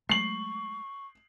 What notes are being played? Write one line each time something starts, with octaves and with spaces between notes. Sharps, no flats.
F#3 G#3 A3 C#6 C7 F#7